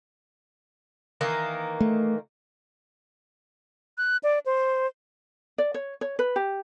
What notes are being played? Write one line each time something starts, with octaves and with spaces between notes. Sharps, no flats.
D#3 E3 A#3
A3
F#6
D5
C5
D5
C#5
C#5
B4
G4